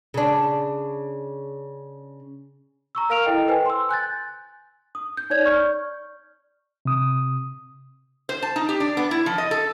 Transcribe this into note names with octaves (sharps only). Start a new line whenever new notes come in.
C#3 D4
A#5 C#6 E6
A#4 F5 A#5 F6 D7 F7
E4 A4 D#5 G5
B4 C5 G5 G#5
C6 E6
G#5 F#6 G6 A6
D#6
G6
D#4 C#5 D5 G#6
D5 C#6 F6 G6
C3 D#6
C5
A5
D#4
G4
D4
B3
E4
F3
D#5
A4